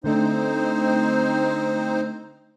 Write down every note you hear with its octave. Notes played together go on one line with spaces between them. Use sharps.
D3 A3 C4 D4 D#4 C5